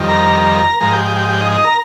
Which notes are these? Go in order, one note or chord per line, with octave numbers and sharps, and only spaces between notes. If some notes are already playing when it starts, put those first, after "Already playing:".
Already playing: F2 D#3 G3
A#4 A#5
G#2 F3 G#3 A#4 A#5
G4 G5
G4 G5
G4 G5
G4 G5
D#4 D#5
D#4 D#5
A#4 A#5